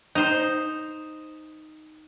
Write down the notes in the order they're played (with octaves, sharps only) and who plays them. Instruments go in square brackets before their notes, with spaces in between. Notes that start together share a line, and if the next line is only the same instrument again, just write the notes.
[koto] D#4 C5